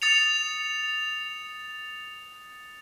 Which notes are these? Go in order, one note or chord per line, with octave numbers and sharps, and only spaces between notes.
D#6 A6 C#7 F7